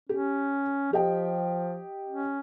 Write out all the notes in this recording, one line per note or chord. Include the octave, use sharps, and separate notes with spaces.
C#4 G4
F3 G4 D#5 G5
C#4